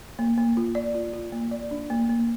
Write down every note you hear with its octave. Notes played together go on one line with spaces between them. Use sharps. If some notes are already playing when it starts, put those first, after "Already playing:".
A#3
A#3
F4
D5
F4
F4
A#3
D5
D4
A#3
A#3